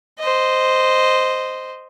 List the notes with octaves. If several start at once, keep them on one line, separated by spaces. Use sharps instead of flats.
C5 D#5